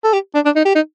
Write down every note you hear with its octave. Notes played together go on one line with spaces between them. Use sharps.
A4
G4
D4
D4
D#4
G4
D#4